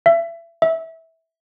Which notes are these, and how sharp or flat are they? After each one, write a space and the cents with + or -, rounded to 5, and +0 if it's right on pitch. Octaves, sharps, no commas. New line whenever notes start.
E5 +30
E5 -15